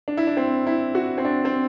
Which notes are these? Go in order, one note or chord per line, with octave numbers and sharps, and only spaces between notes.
D4
E4
D4
C4
E4
F#4
C4
D4
C4